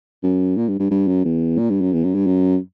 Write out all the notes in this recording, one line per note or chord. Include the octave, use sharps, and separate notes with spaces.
F#2
A#2
G2
G2
G2
F#2
E2
A#2
G2
F#2
E2
F#2
G2
F#2